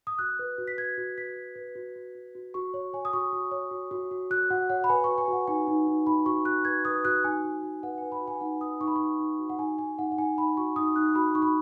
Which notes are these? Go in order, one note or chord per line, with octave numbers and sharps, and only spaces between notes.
D#6
F#4 F#6
B4
F#4
B6
B4 G#6
F#4
B4 B6
F#4
B4
F#4
F#4
F#4
F#4
F#4 C#6
C#5
C#5 G#5
D#6
F#4 C#6
F#4
C#5
F#4
F#4
F#4
F#4 F#6
F#4 F#5
C#5 F#5
B5
B4 G#5
F#4 C#6
G#5
F#4 F#5
D#4 G#5
D#4
D#4
D#4 B5
F#4 C#6
F#4 F#6
B4 G#6
B4 D#6
F#4 F#6
D#4 G#5
F#4
F#4
B4 F#5
B4 G#5
B5
F#4
G#5
D#4 F#5
B4 D#6
D#4 C#6
B5
D#4 C#6
D#4
F#4
F#5
D#4 G#5
D#4 G#5
D#4 F#5
F#5
D#4 G#5
D#4 B5
F#4 C#6
D#4 D#6
D#4 F#6
F#4 B5
D#4 C#6
B5